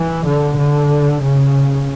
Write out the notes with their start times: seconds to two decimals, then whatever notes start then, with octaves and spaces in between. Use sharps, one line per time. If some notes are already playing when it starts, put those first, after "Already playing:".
Already playing: E3
0.25 D3
0.57 D3
1.20 C#3